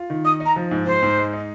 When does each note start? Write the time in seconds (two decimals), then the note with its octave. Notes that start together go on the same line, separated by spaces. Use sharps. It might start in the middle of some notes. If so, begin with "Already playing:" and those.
Already playing: F4
0.10 D#3
0.24 D#4 D#6
0.40 D#4
0.46 A#5
0.56 F3
0.71 G#2
0.86 G#2 C5
1.03 G#2
1.17 G#3
1.33 D#4